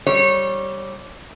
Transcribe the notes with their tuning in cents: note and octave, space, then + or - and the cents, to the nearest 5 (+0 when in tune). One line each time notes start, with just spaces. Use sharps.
G3 -15 C#5 -25